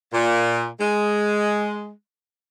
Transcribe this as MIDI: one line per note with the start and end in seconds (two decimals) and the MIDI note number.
0.14 0.66 46
0.81 1.91 56